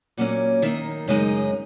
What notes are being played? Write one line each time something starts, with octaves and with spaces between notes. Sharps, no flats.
A#2 F#3 A#3 C#4 F#5
D#3 A#3 D#4 E5
F#2 C#3 G#3 D#4 D#5